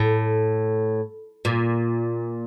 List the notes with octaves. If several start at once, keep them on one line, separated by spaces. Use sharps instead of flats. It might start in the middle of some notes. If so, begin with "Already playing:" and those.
Already playing: A2
A#2